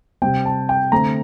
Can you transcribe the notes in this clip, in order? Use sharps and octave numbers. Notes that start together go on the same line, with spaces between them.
C3 G3 C4 G5
A5
G5
D3 A3 C4 A#5